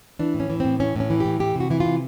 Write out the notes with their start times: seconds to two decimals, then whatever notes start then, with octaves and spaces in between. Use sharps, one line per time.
0.19 E3 D4
0.34 A2
0.40 C#4
0.50 E3
0.60 A2 C4
0.80 E3 C#4
0.96 A2 C#4
1.10 E3
1.20 A2 G4
1.40 E3 G4
1.56 C3 F#4
1.70 E3 E4
1.80 C3 F4